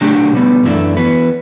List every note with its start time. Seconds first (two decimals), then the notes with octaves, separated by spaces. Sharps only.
0.01 F#3 A3 D4 G4
0.33 B2 G3 B3
0.64 F#2 E3 A3 D4
0.97 E3 B3 F#4 B4